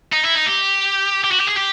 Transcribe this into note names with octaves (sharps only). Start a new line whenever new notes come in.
D#4
E4
D#4
G4
G4
F#4
G4
G#4
G4